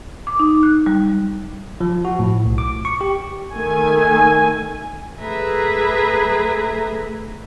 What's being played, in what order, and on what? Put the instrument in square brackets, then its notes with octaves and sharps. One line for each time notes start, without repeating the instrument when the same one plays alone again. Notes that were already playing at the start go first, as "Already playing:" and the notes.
[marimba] D6
D#4
F#6
G3
[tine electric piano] F3
F#4
A2
B1
D6
C#6
G4
[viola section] D#3 A3 G#5
[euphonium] A3 [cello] G#4 B4 [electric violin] E5 A#5